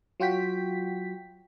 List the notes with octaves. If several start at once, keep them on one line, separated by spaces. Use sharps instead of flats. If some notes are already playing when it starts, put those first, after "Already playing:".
F#3 F4 F#4 G5 B6